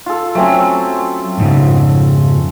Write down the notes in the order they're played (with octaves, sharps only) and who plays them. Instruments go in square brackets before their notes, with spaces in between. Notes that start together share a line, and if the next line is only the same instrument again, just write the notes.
[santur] F4 A4
[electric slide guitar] F#3 [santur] A3 C4 C#4
[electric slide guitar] F2 G#2 C#3